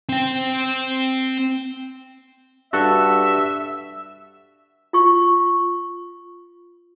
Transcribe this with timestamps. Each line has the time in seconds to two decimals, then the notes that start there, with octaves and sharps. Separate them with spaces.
0.09 C4 G5
2.73 G2 F#4 A4 E5 F#5
4.93 F4 C#6